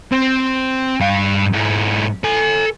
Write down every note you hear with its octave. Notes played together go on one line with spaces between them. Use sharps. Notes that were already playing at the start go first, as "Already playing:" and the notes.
C4
G2 F5
G#2 E4
A4 G#5